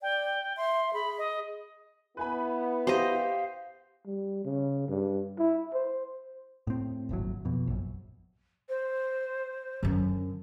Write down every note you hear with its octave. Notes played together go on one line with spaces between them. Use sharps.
D5 G5
E5 C6
G#4 B5
D#5
B3 E4 B4 G#5 B5
G4 C5 D#5 F5
G3
C#3
G2
E4
C5
A2 C4
D#1 G#1 A2 F#3
F2 B2
A#1 F#2
C5
F#2 D3